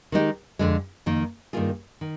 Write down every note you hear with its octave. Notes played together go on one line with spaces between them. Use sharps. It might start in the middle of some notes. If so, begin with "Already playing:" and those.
D#3 G#3 D#4 G4
F2 D3 G#3
F2 D#3 A#3
G2 D#3 A#3 F4 G#4
D#3